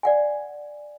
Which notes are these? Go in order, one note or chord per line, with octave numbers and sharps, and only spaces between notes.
D5 F#5 G#5